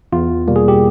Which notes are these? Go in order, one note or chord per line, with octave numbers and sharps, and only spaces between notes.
E2 F4
B2 G3 A#3
G#4
G4